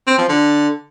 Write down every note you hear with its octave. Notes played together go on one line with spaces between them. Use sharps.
C4
F3
D3